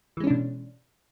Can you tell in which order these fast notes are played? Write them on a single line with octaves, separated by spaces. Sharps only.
E3 G#3 C#4 D4 B2